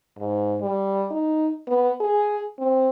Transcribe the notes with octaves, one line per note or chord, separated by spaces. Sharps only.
G#2
G3
D#4
B3
G#4
C4